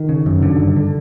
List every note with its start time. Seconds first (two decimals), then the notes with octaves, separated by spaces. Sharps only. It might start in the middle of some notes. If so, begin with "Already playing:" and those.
Already playing: D#3
0.09 C#3
0.26 F#2
0.43 D3
0.59 G2
0.76 D3